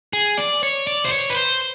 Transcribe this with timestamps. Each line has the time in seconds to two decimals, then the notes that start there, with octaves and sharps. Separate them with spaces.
0.13 G#4
0.38 D5
0.63 C#5
0.87 D5
1.05 C5
1.11 C#5
1.30 B4
1.35 C5